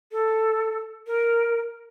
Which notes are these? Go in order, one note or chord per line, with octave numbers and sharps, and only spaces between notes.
A4
A#4